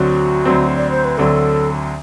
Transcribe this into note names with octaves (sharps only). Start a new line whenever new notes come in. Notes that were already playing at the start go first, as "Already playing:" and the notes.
Already playing: D2 D3 F#3 C4 F#4
D2 D3 F#3 C4
D5
C5
B4
D2 D3 F#3 C4 A4